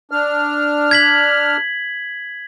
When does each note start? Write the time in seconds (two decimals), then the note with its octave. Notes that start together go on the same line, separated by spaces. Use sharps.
0.11 D4 F6
0.91 G#6 B6 F#7